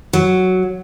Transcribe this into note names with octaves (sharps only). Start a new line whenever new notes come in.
F#3